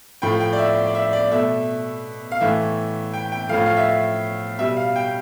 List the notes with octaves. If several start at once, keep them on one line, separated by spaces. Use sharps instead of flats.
A2 F3 A3 G5
G5
D5
E5
D5
E5
D5
B2 A3 E5
F5
A2 E3 A3 E5
G5
G5
A2 F3 A3 F5
F5
E5
B2 G3 E5
F5
G5